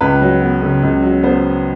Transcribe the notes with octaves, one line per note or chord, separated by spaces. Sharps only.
C#2 B4
F#3
B3
C#3
C#2
F#3
B3 C5